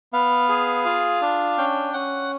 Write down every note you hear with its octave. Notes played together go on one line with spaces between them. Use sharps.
B3 F5
G#4
F4
D4
C#4 G5
C#4 F#5